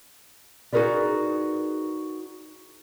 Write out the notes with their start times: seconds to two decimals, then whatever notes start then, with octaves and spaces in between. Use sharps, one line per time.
0.73 D#4 F#4 G#4 A#4 B4 D5